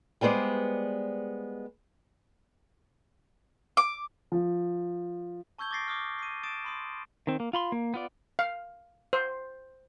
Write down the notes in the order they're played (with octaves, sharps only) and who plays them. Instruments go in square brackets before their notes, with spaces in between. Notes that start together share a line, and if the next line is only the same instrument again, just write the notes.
[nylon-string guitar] G3 G#3 B3 C5 D5
[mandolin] D6
[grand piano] F3
[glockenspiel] A5 C#6 E6 G6 G#6 G7
D6 D#6 A6 A#6 C7 D7
D6 D#6 F6
C7 D#7
D#6 A6 D7 E7
B5 C6 D#6
[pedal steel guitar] D#3 C4
A#3
F4 B5 C6
A#3
B3 F4 D5
[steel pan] F5
C5